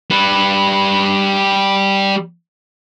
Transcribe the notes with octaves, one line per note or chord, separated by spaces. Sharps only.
G3 B4